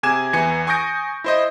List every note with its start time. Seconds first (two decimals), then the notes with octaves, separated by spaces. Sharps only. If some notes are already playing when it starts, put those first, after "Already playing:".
0.03 C3 G#4 G#5 D6 G#6 E7
0.33 E2 E3 G#5 C#7
0.67 G#5 C#6 D#6 G6 A#6 D7
1.24 E4 C5 D#5